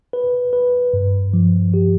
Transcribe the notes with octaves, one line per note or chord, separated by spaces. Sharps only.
B4
B4
G2
F3
G4